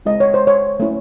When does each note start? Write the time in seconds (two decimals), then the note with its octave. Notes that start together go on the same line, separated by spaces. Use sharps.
0.06 G#3 C4 E4 D#5
0.20 C#5
0.34 C5
0.47 C#5
0.80 A3 C#4 E4